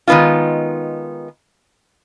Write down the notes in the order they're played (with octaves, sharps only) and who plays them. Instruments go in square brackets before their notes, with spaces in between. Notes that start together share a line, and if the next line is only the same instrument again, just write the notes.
[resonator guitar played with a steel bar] D#3 G#3 B3 D#4 F4